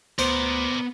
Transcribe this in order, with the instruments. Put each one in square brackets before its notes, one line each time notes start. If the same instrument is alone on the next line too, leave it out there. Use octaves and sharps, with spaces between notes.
[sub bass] D2 [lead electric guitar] B3 [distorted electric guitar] A#4 D5 [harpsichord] C5